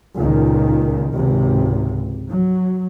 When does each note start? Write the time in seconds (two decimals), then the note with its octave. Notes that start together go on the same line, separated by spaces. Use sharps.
0.18 C#2 A#2 D#3
1.14 G#1 C#2 C3
2.29 F#3